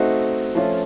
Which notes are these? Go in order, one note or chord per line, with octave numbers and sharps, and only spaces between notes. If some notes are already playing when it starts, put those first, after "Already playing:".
Already playing: A3 C4 D#4 F#4
F3 A3 C#4 F4